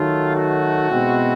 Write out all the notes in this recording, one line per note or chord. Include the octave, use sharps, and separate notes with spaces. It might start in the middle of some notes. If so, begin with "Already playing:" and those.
Already playing: D#3 F#3 A3 F4
F#4
B2 G#3 C4 E4